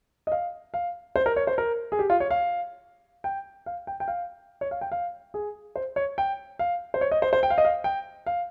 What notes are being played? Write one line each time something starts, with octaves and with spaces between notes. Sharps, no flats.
D#5
F5
F5
C5
A#4
C#5
C5
A#4
G#4
G4
F4
C#5
F5
G5
F5
G5
G5
F5
C#5
F5
G5
F5
G#4
C5
C#5
G5
F5
C5
C#5
D#5
C5
C5
G5
F5
D#5
F5
G5
F5